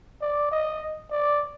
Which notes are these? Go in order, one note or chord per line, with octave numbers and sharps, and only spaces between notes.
D5
D#5
D5